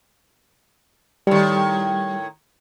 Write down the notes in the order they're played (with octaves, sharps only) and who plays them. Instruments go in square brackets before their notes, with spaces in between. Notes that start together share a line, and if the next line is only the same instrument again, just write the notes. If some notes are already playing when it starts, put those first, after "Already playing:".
[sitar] A2 D#3 [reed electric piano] G3